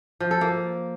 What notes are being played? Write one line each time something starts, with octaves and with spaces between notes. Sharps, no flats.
F3
A4
A#3